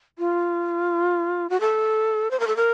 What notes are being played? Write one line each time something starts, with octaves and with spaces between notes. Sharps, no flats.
F4
F#4
A4
C5
A#4
A4
A#4